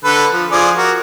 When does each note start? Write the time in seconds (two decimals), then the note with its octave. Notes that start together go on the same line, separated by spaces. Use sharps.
0.05 D3 A4 B4
0.33 F3
0.52 F3 G#4 D5
0.77 F#4 A#4